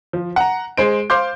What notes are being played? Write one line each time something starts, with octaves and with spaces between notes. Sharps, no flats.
F3
F#5 A#5
G#3 C5 D7
C5 F5 C6 D6 G6